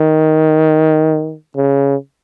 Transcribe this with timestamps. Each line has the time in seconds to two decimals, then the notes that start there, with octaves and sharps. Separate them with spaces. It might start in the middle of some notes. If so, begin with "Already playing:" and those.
Already playing: D#3
1.57 C#3